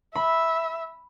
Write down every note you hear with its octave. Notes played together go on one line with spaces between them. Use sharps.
E5 B5